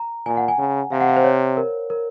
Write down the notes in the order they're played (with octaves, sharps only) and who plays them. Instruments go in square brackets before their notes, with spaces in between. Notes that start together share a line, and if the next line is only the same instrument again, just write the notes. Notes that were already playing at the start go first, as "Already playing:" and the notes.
Already playing: [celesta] A#5
[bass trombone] A#2 [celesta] G#5
[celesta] F#5
G#5
[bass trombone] C#3 [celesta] G#5
[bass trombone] C3 [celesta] F5
[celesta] F#5
F5
C5
C#5
A#4
A#4